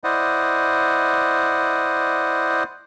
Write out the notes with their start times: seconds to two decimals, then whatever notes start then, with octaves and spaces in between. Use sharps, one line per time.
0.04 E4 C5 D5 D#5 F#5